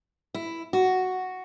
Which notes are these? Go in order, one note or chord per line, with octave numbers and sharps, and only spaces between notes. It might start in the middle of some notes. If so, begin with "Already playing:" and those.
E4
F#4